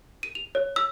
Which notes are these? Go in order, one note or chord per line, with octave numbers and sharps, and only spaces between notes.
D#7
F7
C#5
E6